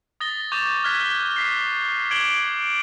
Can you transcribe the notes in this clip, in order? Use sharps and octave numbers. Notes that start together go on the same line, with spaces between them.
D#6 A6 A#6 G7
C#6 D6 G6 A6 F7
F6 F#6 G#6 B6
B6 C7
D6 G#6 D7 F#7 G7